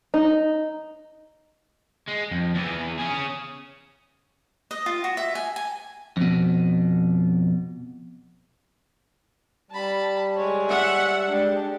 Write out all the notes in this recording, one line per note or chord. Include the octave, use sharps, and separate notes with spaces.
D#4
G#3
F2
E2 E3
C#4 G#4
D#5
F4
F#4
E5
G#5
G#5
F2 B2
G3 A5 B5
G#3 C#5
E5 F#5
G#3 D4 G4